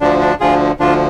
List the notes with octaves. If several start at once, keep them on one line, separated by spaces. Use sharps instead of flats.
D2 D3 F3 D4
D4
D2 D3 F3 F4 G#4
D2 D3 F3 D4 F4